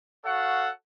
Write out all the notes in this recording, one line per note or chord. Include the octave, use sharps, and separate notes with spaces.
F#4 A4 C#5 F5 F#5